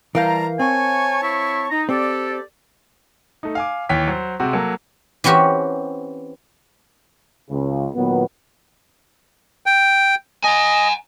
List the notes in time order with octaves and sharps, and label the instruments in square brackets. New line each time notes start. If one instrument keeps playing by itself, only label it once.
[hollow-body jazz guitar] E3 [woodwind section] G3 A5 A#5 [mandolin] A#4 F5 G6
[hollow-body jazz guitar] C4 [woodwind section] C#5 A5 C#6 [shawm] G#5
[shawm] E4
[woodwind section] D#4 [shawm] A#5
[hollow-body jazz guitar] C4 [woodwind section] G4 D5 [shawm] A4
[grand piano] A3 D#4
F5 G#5 D6
D#2 E3 C#5 G5 B6
F#3 C5
C3 G#3 C4 F#4
F#3 A#3 A4
[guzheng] E3 C4 C#4 F#4 G4 E5
[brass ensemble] C#2 C#3
A#2 D#3 F#3 B3
[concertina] G5
[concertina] D#5 [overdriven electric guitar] F#5 G#5